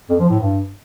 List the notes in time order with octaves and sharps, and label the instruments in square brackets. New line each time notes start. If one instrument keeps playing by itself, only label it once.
[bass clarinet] F2
F3
A2
G2